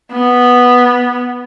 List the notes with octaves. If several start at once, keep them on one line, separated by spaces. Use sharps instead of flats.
B3